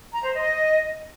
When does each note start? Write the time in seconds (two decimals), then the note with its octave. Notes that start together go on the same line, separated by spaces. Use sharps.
0.13 A#5
0.23 C5
0.34 D#5